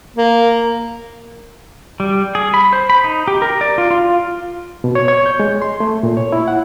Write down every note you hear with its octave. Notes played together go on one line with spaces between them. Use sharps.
A#3
G3
G#4
B5
C5
B5
D#4
G4
A#4
D5
F4
F4
B2
C#5
C#5
G6
G#3
C6
A3
A#2
C#5
E4
F#5